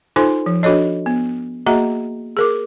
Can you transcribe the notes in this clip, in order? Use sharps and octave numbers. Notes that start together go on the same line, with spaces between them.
D#4 F4 A4 C5 G#5 C6
F3
D4 F#4 A4 C#5 D#5
B3
A#3 F#4 G#4 D#5 E5 A#5
G#4 A#4 D6